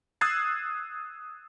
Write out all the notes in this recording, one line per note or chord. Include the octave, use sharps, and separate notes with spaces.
D#6 E6 F#6 G#6 A6 C7